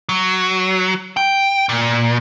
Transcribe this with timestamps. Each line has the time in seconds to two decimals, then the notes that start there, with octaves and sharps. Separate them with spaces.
0.09 F#3
1.17 G5
1.69 A#2